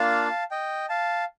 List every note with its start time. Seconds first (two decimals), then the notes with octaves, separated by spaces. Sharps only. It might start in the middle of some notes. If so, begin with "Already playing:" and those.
Already playing: A#3 D4 F4 F5 A5
0.51 D#5 G5
0.89 F5 A5